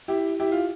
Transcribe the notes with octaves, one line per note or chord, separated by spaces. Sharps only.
E4 G4
E4 G4
F4